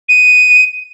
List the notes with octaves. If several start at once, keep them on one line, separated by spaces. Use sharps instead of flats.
D#7